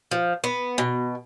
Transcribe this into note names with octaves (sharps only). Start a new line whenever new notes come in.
F3
B3
B2